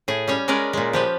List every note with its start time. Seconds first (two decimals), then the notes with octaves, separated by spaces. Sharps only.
0.08 A2 G#4
0.28 G3 C#4 C#5
0.48 G#3 C#4 A#4 B4 D5
0.73 A#2 G#3
0.93 F3 G4 B4